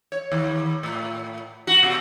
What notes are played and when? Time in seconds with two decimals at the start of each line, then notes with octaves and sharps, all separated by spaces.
0.12 C#5
0.32 D#2
0.83 A2
1.67 F#4
1.83 B2